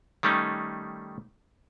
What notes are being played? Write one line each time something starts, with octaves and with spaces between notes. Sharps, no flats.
D#3 G3 A3 C#4 D#4